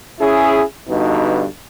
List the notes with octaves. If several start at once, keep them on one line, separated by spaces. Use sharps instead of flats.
C#4 E4 G#4
G2 B2 D3 D#4